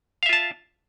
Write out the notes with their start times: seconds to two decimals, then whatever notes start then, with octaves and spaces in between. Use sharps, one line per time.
0.23 F5
0.26 E5
0.29 F4
0.33 A5